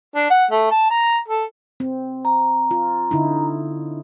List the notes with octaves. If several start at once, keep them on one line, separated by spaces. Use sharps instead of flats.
D4
F#5
A3
A5
A#5
A4
C4
A#5
F4
D3 D#4 E4